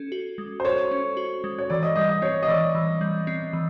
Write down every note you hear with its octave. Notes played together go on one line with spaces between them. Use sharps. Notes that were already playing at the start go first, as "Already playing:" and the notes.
Already playing: C#4 A4
F#4
G#3
C5
A4 C#5
C#4
F#4
G#3
C#5
E3 D5
D#5
G3 D#5
D#5
C4 C#5
D#5
E3 D5
E3
G3
C4
E3